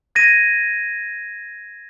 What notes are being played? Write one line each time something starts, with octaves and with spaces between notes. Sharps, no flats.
G#6 A#6 D#7